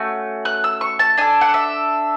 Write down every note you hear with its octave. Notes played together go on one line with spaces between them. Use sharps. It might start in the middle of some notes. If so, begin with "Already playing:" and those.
Already playing: A3 C#4 F#4
F#6
E6
C#6
A5
D4 A4 G#5
F#5
E5